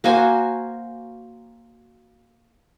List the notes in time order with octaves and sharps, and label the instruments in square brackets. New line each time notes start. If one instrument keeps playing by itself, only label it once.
[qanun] A#3 F#4 C5 G#5